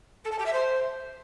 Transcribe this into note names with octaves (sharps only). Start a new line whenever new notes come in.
A4
A5
G4
E5
C5